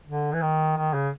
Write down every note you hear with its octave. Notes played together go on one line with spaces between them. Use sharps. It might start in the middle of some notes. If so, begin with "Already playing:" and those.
D3
E3
D#3
D#3
C#3